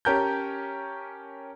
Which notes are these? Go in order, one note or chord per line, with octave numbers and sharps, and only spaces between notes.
C#4 G4 A#4 A5 G6